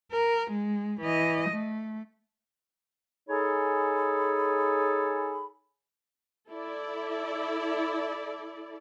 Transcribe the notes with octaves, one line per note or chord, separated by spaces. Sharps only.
A#4
G#3
E3 D#5
A3
D#4 G#4 A4 C#5 G#5 B5
E4 A4 D5